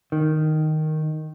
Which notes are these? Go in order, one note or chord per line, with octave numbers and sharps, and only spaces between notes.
D#3